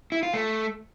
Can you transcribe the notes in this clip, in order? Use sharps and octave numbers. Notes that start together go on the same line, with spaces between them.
E4
F4
A3